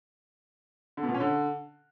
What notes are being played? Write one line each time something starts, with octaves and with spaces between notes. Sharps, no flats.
D3
B2
A#2
C#4
D3